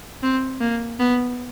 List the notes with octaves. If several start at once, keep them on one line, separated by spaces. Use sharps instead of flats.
C4
A#3
B3